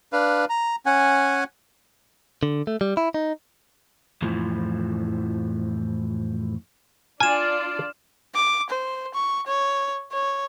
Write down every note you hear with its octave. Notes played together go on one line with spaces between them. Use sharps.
D4 B4 F5
A#5
C#4 F#5 G#5
D3
A3
G3
E4
D#4
F2 A2 E3 F3
D4 F4 D5 G#5 F6 E7
D6
C5
C#6
C#5
C#5